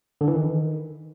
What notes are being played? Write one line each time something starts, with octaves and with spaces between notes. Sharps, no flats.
D3
E3
D#3